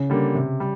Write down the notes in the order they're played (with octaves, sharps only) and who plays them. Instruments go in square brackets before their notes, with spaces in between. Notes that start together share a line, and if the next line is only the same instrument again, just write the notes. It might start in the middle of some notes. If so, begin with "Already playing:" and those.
Already playing: [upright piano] C#3
[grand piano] D3 G3 A#3
C3
G3